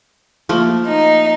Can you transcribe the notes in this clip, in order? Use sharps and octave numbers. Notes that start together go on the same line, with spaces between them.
F3 A3 A#3
D#4